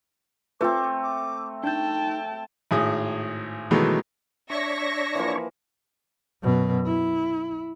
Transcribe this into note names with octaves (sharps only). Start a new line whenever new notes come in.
A3 C4 F4 B4 D6
D6
D4 D#4 G5 A5 G6
G#1 A2 G#4 D#6
B2 D#3 E3 F#3 G#3 A3
D4 C#5 E5 C#6 A#6
E3 F3 A#3
F#2 B2
E4